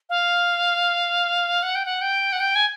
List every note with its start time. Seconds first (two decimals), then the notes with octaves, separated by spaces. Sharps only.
0.10 F5
1.63 F#5
1.75 G5
1.86 F#5
2.01 G5
2.33 F#5
2.40 G5
2.55 G#5